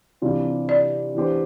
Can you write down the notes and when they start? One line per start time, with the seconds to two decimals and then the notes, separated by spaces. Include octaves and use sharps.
0.22 C3 E3 G3 D4 F4
0.69 D5
1.14 E3 B3 D4 G4 C5